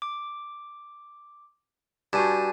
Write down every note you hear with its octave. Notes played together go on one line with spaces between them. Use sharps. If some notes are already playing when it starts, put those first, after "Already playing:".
D6
G2 F#4 G#5 A5